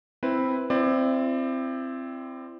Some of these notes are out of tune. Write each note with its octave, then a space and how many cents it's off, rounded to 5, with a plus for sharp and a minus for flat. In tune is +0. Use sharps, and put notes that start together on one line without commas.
C4 +0 E4 +0 B4 +0
C4 +0 E4 +35 D5 +25